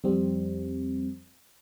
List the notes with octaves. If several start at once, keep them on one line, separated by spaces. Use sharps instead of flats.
F2 G3 C4